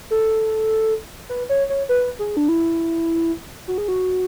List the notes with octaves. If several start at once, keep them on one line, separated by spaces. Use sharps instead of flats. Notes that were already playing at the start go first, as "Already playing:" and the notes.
A4
B4
C#5
C#5
B4
G#4
D4
E4
F#4
G#4
F#4